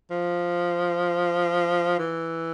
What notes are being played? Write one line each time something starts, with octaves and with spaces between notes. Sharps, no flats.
F3
E3